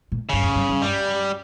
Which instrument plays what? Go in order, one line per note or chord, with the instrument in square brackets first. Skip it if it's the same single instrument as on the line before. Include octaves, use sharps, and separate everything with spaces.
[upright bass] A#2
[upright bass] G2 [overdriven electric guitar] C#3
[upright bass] F2
G2
G2
[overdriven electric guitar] G3